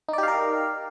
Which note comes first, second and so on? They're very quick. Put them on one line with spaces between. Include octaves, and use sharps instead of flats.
D#4 D5 G4 F5 A#4